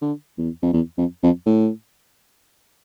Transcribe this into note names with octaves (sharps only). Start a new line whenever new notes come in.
D3
E2
F2
E2
F2
F2
A2